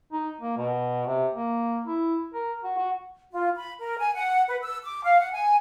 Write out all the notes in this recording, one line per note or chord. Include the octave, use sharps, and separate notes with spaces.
D#4
A#3
B2
C3
A#3
E4
A#4
F#4
F#4
F4
B5
A#4
G#5
F#5
B4
E6
D6
F5
F#5
G#5